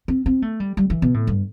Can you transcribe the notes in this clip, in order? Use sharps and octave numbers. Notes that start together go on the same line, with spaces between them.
C4
C4
A3
G3
G3
E3
B2
A2
G2